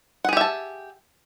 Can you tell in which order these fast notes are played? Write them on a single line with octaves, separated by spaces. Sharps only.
F#5 G#4 G4 E5 A5